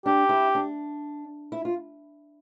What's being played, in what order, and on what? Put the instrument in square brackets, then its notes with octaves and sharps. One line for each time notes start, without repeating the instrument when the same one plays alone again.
[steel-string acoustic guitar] D4 [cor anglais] G4
[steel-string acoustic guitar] E4
D4
E4
F4